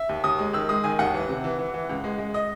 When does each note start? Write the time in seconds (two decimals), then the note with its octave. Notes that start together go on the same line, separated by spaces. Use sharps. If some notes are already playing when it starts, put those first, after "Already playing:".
Already playing: E5
0.09 D#2
0.24 D#2 D#6
0.39 G#3
0.53 D#3 E6
0.69 G#3 D#6
0.84 D#3 G#5
0.99 D#2 F#5
1.14 E3
1.29 C3
1.44 E3
1.59 E3
1.74 E3
1.89 C#2
2.04 G#3
2.18 G#3
2.34 D#5